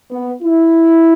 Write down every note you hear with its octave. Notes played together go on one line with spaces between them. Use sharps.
B3
E4